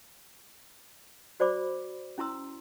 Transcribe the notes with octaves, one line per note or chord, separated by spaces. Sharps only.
F#4 C5 D5 B5 D6
C#4 E4 A#5 C6 E6